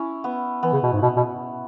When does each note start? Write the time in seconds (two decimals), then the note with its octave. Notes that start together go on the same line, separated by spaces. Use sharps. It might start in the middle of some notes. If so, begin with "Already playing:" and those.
Already playing: C#4 E4
0.24 B3
0.63 E3 B3
0.73 C#3
0.83 B2
0.93 G#2
1.02 B2
1.17 B2